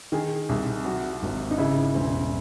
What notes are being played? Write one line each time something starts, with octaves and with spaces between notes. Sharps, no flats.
D#3 G#4
C2
F#3 F#4
G#1
D#4
C#3 E4
E1 C4